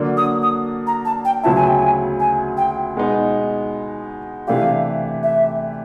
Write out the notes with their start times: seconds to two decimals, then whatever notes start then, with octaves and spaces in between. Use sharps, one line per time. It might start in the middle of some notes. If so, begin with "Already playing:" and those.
Already playing: D3 F#3 A#3 D4
0.17 D#6
0.42 D#6
0.87 A#5
1.05 A5
1.25 G5
1.43 D2 C#3 F#3 B3 E4 A5
1.55 G#5
1.67 G5
1.79 G#5
2.20 G#5
2.57 G5
2.95 B2 G#3 B3 D#4
4.47 C3 E3 A3 D4 G4 F5
5.23 E5